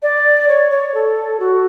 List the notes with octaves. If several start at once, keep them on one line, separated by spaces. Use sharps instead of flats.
D5
C#5
C#5
A4
F#4